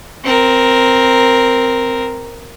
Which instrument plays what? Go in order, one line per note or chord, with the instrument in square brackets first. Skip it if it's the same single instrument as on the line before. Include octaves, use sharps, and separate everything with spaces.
[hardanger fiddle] C4 A#4